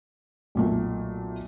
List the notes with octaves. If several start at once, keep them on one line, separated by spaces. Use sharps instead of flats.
B1 A#2 A3